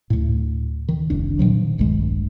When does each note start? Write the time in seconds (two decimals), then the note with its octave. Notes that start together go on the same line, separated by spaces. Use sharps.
0.10 D2 A2
0.89 D#3
1.10 F1 C2 D4
1.39 A#2 D#3 F3 F#3
1.78 D1 A#1 G2 G#3